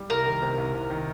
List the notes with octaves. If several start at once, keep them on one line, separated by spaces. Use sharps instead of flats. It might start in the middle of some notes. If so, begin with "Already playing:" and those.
Already playing: G3
C2 A#4
D#3
C3
C2
C2
D#3